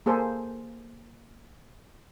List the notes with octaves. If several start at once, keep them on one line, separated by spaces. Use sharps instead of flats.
A#3 G#4 A4 C5